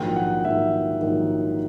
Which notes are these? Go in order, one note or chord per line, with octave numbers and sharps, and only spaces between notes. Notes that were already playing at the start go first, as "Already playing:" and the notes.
Already playing: A#1 G#2 D#3 F#3 G5
F#5
A#1 G#2 D#3 F#3 E5
A#1 G#2 D#3 F#3